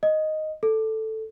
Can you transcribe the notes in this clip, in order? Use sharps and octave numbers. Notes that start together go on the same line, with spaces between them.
D#5
A4